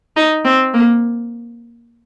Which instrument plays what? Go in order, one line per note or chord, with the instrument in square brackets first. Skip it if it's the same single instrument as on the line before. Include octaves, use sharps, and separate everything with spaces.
[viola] D#4
C4
A#3